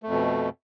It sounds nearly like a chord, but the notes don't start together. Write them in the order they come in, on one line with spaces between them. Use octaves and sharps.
A3 F2 B2